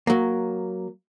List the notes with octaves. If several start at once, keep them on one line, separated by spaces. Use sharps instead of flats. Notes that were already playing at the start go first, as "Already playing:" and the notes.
F#3 A#3